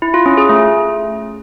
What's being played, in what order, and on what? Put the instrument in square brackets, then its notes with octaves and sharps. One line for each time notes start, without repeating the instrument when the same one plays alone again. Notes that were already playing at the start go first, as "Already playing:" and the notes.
[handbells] E4
F4
C#4
G#4
A3